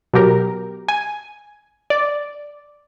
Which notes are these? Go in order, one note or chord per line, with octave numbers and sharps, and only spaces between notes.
B2 F#3 G4 A#4
G#5
D5